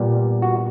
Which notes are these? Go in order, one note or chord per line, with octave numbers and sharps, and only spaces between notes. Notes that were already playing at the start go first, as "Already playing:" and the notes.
Already playing: A#2 G3 B3
F#4